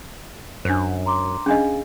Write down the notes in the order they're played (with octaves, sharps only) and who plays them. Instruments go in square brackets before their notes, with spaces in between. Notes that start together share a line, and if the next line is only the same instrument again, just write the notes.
[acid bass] F#2 [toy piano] D4 C5
[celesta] A#5 C6 D6
[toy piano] C#4 D4 D#5 [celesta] G#4 F5 G#5